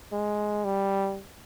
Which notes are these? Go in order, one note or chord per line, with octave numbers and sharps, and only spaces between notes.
G#3
G3